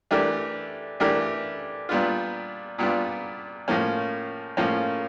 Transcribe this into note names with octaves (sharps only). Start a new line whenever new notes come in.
E3 A3 D4 G4 A#4
E3 A3 D4 G4 A#4
A#2 G3 B3 D4 F4
A#2 G3 B3 D4 F4
A2 F3 A#3 C#4
A2 F3 A#3 C#4